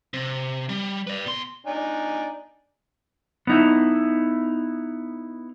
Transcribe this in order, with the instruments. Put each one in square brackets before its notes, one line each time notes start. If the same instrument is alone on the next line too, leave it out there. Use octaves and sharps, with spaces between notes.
[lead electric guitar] C3
G3
B4 D5
B2 C6
[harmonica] D4 D#4 G#5
[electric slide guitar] B3 D#4 E4